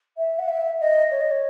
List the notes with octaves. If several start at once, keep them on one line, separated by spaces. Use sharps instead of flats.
E5
F#5
E5
D#5
C#5
D#5
C#5